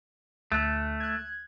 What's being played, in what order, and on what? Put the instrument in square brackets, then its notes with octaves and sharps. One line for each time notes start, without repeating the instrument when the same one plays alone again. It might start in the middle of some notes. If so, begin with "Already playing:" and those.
[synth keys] D2 F#6 [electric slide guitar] A3
[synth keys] F#6 G#6